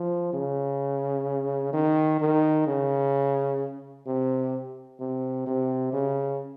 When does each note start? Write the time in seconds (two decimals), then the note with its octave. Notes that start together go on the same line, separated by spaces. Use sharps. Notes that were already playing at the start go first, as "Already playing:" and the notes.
Already playing: F3
0.33 C#3
1.73 D#3
2.20 D#3
2.67 C#3
4.07 C3
5.00 C3
5.46 C3
5.93 C#3